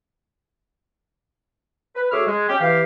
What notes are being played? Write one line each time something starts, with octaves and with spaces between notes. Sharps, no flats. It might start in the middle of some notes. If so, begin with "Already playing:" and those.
B4
D2 G#4 C#5 E5 D6 F6
G#3
C#4 G4
E3 G4 F5